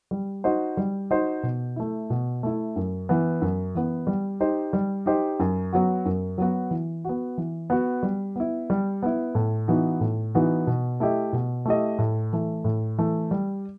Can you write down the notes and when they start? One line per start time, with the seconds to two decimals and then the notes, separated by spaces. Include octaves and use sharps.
0.11 G3
0.44 D#4 F#4 C5 D#5
0.77 G3
1.10 D#4 F#4 C5 D#5
1.43 B2
1.76 A3 E4
2.10 B2
2.43 A3 E4
2.76 F#2
3.09 E3 B3
3.42 F#2
3.75 E3 B3
4.07 G3
4.40 D#4 G4 C5 D#5
4.73 G3
5.06 D#4 G4 C5 D#5
5.40 F#2
5.73 F#3 B3 F#4
6.06 F#2
6.38 F#3 B3 F#4
6.71 E3
7.05 B3 F#4
7.38 E3
7.70 B3 F#4
8.03 G3
8.36 B3 E4
8.70 G3
9.03 B3 E4
9.35 A2
9.68 E3 B3 D#4 F#4
10.01 A2
10.35 E3 B3 D#4 F#4
10.67 B2
11.00 A3 E4 G4 D#5
11.33 B2
11.65 A3 E4 G4 D#5
11.98 A2
12.33 E3 A3
12.64 A2
12.98 E3 A3
13.31 G3